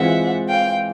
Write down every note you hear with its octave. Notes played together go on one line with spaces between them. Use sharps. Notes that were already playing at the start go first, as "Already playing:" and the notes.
Already playing: E3 G#3 C4 F4 E5 F#5
F5 G5